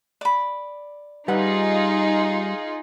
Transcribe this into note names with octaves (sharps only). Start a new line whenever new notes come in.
D5 B5
G3 D#4 F4 G#4 B4 F#5